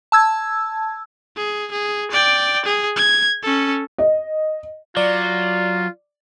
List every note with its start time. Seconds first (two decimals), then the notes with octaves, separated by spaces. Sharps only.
0.12 A5 E6 G#6
1.36 G#4
1.72 G#4
2.11 D5 G5
2.65 G#4
2.96 G#6
3.43 C#4 A4
3.98 D#5
4.97 F#3 F4 D5